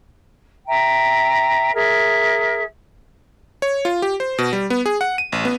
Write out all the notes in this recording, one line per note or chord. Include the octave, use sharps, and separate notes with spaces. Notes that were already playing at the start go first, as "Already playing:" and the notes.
E5 G5 A#5
G#4 A#4 E5
C#5
F4
G4
C5
B2
G3
B3
G#4
F#5
D#7
A1
B3